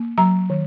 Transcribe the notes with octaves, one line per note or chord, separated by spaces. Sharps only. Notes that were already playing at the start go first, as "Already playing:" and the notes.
Already playing: A#3
F#3 A#5
D#3